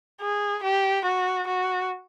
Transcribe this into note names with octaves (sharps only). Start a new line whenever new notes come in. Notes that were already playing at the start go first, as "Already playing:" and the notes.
G#4
G4
F#4
F#4